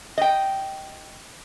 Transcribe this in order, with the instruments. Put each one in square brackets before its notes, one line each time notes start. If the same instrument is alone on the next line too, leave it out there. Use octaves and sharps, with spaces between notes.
[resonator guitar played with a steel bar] D#5 G5